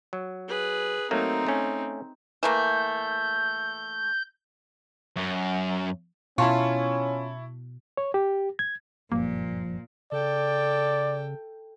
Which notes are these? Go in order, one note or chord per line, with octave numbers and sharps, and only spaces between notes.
F#3
G#4 B4
F#3 A3 A#3 C4 D#4
A3 C#4
E3 A3 A#3 G6
F#2
B2 C#4 E4 F4 A5 C#6
C#5
G4
G#6
F#1 G2 A#2 F3 A#3
C#3 A4 D5 G5